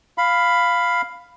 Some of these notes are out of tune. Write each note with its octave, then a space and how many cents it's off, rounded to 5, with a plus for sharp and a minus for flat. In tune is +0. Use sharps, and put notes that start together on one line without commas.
F5 +0 B5 +10